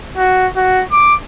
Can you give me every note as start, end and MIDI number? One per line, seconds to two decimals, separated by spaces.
0.18 0.47 66
0.57 0.84 66
0.92 1.15 86